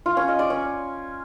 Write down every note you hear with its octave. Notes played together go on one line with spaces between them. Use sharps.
F4
C#4
D#5
D5
C#4